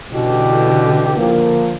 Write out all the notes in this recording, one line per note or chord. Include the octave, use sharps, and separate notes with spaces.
A1 B2 D3 E3 G4
F3 A#3